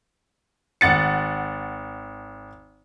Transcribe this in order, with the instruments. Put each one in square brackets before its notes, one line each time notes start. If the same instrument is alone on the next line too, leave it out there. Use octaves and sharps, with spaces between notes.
[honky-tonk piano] G#1 F#5 A6 C#7